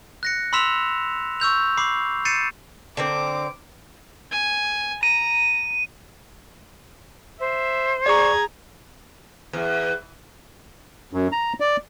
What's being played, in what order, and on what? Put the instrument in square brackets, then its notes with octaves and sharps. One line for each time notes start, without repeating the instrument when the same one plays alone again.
[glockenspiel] F#6 A#6 C#7
B5 C6 E6 B6 E7 F7
C#6 E6 G6 F7
B5 D6 C7
G6 A6 C7 C#7 D#7 E7
[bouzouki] D3 C4 A#4 [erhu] D6
[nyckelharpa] G#5
[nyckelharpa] A#5 [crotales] D#7
[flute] C5 [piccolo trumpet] E5
[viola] G#4 A#5 [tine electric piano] D5 C#6 [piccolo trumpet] G#6
[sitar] E2
[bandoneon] F#2
A#5
D5